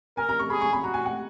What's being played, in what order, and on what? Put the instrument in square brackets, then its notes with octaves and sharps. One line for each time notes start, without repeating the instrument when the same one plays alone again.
[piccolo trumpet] A#4 [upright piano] G#5
[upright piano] A#5
C#6
[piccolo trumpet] G#4 [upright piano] B5
[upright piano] C#6
B5
[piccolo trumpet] F#4 [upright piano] A#5
[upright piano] G#5
F#5